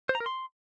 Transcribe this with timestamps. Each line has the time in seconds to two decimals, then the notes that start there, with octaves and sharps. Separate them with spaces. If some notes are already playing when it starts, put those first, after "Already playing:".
0.09 C5
0.15 A#5
0.20 A#4
0.26 C6